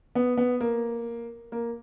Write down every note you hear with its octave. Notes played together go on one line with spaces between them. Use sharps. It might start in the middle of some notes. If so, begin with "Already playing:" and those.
B3
B3
A#3
A#3